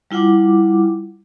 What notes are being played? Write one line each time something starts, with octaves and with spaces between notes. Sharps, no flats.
G3 E4 F4 F#5 D6